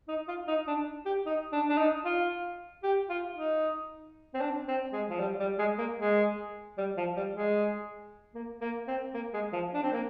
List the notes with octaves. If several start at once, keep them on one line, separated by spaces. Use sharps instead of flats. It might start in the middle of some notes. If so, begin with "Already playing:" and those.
D#4
F4
D#4
D4
G4
D#4
D4
D4
D#4
F4
G4
F4
D#4
C4
D4
C4
G#3
F3
G3
G3
G#3
A#3
G#3
G3
F3
G3
G#3
A#3
A#3
C4
A#3
G#3
F3
D4
C4
A#3